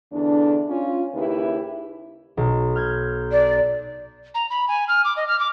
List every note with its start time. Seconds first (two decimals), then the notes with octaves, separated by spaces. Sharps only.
0.13 E2 D3 D4
0.70 C#4 F4
1.14 D#2 C#3 E4 G4 B4
2.37 B1
2.76 F6 G6 G#6
3.32 D5
4.35 A#5
4.50 B5
4.68 G#5
4.88 F6
5.05 D6
5.17 D#5
5.28 F6
5.39 D6